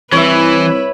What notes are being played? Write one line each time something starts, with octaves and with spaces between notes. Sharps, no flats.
C2 E3 E4 B4 C#5 E5